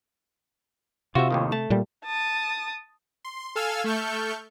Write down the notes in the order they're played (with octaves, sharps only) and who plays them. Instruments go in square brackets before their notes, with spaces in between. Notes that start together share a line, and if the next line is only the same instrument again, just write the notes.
[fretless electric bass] C3 [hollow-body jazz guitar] F4 [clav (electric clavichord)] F#4 E5
[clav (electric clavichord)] D#2 A2 D#3
[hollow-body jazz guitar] A3 [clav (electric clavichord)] A5
[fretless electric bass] A#2 G3
[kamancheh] A5 D#6
[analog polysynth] C6
A4 F5 G#5 E6 F6 G#6
A3 A4 C#6 F6 G6